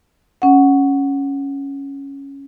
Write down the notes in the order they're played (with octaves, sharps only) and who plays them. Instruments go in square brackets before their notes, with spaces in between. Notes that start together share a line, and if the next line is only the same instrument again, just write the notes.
[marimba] C#4 F#5